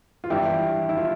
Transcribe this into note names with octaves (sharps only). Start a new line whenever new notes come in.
F4
G2 E3 E4 G4
E4
F4